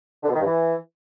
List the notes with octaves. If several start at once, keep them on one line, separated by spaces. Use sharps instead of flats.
D3
B2
D#3
G2
E3